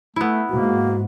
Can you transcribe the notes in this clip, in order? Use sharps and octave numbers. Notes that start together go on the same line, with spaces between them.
A3 B3 E4
G#2 A#3 F#4